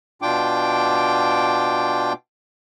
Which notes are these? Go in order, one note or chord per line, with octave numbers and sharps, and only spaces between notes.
B2 D4 F4 G5 D6